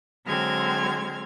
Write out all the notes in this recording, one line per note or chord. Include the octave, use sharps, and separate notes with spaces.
D3 F#3 G#3 C4 F6 G#6